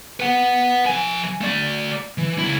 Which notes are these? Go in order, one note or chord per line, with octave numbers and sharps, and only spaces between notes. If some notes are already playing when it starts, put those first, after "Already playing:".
B4 F#5
F3 G#5
A3 D5
E3
C#2 E4